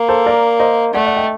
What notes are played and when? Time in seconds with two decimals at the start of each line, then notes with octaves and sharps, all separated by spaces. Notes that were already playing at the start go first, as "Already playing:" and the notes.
Already playing: A#3
0.09 A4 C5
0.26 A#4 D5
0.60 C5 D#5
0.94 A3 D5 F#5
1.06 D5 F#5
1.17 D#5 G5